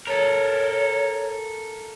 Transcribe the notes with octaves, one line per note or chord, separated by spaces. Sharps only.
A4 A#4 C#5